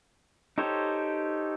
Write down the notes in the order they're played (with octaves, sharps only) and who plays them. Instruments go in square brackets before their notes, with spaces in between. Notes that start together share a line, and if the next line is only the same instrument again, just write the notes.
[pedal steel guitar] D#4 G4 A4 C5 C#5